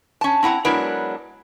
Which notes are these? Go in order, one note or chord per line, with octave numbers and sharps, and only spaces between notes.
C#4 A5
C4 E4 F#5 A#5
F#3 G#3 B3 D4 E4 A#4